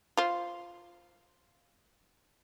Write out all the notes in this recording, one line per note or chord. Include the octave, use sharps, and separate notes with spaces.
F4 C5